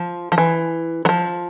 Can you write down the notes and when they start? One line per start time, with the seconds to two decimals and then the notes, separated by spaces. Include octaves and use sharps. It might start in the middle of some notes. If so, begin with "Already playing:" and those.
Already playing: F3
0.32 F3
0.38 E3
1.05 F#3
1.09 F3